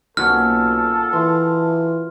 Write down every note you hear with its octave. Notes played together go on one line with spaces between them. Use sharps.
B1 A#2 C#4 F#4 A4 F6
E3 C6